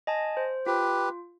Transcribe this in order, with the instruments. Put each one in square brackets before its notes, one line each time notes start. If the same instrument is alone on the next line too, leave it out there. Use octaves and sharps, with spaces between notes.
[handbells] D#5 G#5 A5
C5
[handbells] F4 [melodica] G4 B4